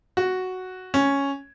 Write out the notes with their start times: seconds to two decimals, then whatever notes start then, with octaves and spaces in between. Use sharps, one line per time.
0.17 F#4
0.94 C#4